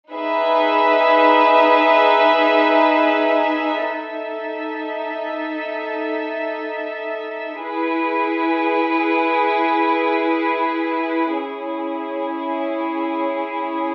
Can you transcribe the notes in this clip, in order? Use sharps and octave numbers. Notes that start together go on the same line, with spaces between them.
D#4 G#4 B4 E5
D#4 A4 E5
E4 G#4 B4
C#4 E4 G#4